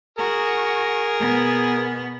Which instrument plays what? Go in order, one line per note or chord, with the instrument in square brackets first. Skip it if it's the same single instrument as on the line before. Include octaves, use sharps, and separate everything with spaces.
[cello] F#4 [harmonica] G#4 A#4
[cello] B2 B3